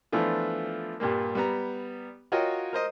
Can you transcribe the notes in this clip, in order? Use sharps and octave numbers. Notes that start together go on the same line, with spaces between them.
E3 F3 A3 B3 D4 F4
G2 A#2 G3 A#3
G3 B3 A#5
F4 F#4 A#4 C#5 D#5 G5
A#4 C5 D#5